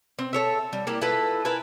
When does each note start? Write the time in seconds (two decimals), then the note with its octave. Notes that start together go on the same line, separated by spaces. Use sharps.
0.19 C4
0.33 A4 C#5 E5
0.73 G3
0.87 A#3 E4 G4
1.02 E4 F4 A4 B4
1.45 E4 A#4 B4 G#5